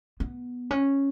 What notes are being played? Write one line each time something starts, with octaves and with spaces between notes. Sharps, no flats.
B3
C#4